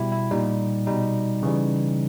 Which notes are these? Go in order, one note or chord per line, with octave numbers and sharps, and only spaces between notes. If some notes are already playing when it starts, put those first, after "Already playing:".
Already playing: B2 G3 E4 G4
E4
A#2 G3 D#4
B2 G3 D#4
C#3 E3 G3